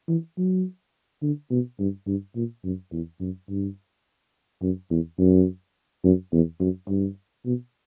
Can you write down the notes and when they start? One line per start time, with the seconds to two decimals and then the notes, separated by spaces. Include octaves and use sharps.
0.08 E3
0.38 F#3
1.22 D3
1.51 B2
1.79 G2
2.07 G2
2.35 A#2
2.64 F#2
2.92 E2
3.21 F#2
3.49 G2
4.62 F#2
4.90 E2
5.18 F#2
6.04 F#2
6.32 E2
6.60 F#2
6.89 G2
7.45 B2